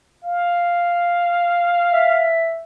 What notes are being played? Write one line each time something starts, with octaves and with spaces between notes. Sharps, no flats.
F5
E5